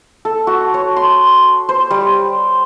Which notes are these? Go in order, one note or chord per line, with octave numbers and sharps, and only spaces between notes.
A4
F#4
C#5
C6
C5
G3